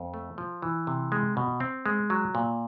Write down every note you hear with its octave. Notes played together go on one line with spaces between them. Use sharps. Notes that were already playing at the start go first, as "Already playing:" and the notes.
Already playing: F2
A3
F3
E3
C3
G#3
B2
C4
G#3
F#3
A#2